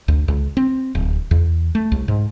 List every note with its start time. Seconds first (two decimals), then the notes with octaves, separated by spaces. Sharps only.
0.08 D2
0.28 C#2
0.57 C4
0.95 D1
1.31 E2
1.75 A3
1.92 C2
2.08 G#2